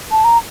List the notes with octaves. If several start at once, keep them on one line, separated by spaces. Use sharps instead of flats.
A5
A#5